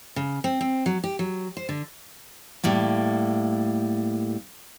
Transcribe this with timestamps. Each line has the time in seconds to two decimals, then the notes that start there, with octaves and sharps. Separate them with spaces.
0.16 C#3
0.44 C4
0.61 C4
0.86 F#3
1.04 G4
1.19 F#3
1.57 C5
1.69 D3
2.64 A2 G3 A#3